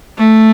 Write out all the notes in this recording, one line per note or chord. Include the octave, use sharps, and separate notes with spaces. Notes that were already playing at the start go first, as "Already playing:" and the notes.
A3